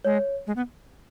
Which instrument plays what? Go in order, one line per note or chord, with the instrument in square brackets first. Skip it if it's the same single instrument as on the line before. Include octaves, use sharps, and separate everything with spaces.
[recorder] G#3 [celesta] C#5
[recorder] G#3
B3